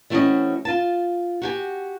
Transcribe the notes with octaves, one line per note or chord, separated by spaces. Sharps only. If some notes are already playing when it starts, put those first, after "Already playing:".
E3 A3 C4 C#4 F#4 D#5
F4 A5
F#4 G4 G#5